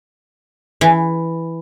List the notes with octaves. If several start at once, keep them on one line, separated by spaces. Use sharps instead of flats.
E3